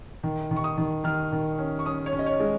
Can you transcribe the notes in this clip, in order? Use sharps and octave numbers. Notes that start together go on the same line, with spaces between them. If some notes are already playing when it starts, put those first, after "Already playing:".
D#3
D#3
C#6
D#6
D#3
D#3 F6
D#3
C#4
C#6
C#4 D#6
C#5
C#4
D#5
C#5
G#3